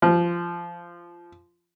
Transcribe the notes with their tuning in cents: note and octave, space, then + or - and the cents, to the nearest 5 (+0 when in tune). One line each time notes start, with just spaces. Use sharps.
F3 -15